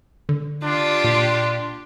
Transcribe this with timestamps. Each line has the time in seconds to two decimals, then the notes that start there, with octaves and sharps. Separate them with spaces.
0.29 D3
0.63 D4 F4 G4
1.04 A#2